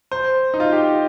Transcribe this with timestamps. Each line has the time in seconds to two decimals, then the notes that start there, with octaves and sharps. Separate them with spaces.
0.12 C5
0.54 D#4
0.60 F4
0.72 G4